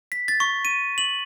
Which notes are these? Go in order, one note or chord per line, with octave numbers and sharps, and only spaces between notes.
B6
A6
C#6
D#7
F#7